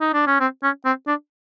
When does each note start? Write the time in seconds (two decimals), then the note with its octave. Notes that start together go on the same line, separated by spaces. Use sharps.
0.01 D#4
0.13 D4
0.27 C#4
0.40 C4
0.63 C#4
0.85 C4
1.07 D4